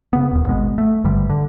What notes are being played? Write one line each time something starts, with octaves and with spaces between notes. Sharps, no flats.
C#3 B3
D#1 D#2
G#1 B2 G#3 B3
A3
G#1 G2 D3 G3
D3